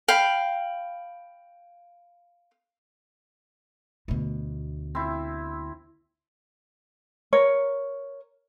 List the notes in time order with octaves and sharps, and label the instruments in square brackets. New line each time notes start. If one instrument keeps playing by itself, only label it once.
[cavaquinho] F5 G5 B5
[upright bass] D2 B2
[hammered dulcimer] C4 E4
[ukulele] A#4 C#5